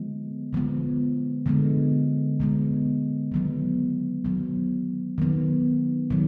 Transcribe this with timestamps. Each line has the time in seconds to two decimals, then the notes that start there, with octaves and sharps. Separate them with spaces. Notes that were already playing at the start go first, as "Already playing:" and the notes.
Already playing: D3 F3 G#3 B3
0.53 D3 F3 G#3 B3
1.46 D3 F3 G#3 B3
2.40 D3 F3 G#3 B3
3.32 D#3 F#3 B3
4.25 D#3 F#3 B3
5.18 D#3 F#3 B3
6.10 D#3 F#3